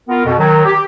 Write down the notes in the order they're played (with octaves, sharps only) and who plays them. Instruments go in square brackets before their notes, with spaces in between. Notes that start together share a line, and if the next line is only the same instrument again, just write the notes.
[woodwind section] B3 F4 A#4
F2 B2
D#3 F#3
G4